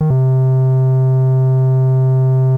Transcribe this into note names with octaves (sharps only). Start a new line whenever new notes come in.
D#3
C3